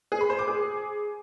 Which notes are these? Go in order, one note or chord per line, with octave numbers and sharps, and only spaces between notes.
G#4
B5
C5
D6
G#4